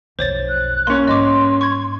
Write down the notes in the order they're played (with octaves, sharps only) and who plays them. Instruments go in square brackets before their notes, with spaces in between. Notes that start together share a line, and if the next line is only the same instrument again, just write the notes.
[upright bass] B1 F2 [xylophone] C5 C#5 A6
[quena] F#6
[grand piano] A#3 C#4 [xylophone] C6
[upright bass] G#2 G3 [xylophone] D#5 D6 [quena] C6
[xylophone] C#6 G#6